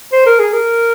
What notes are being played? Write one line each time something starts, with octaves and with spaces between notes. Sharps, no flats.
C5
A#4
G#4
A#4